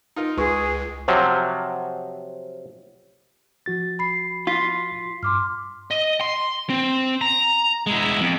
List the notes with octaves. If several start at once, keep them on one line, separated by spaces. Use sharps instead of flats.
D#4 F4 A#4
C#2 G#3 F4 G#4 B4 C#6
C3 F3 F#3
F3 F#4 A6
B5 C7
F4 B6 C7
G2 C6 D6 F6
D#5
C6
C4
A#5
G#3 E4
F2